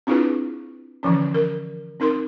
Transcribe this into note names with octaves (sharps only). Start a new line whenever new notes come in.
C4 D4 E4 F4 G#4 B4
D3 E3 F3 C#4
A#4
C4 D#4 A#4 C6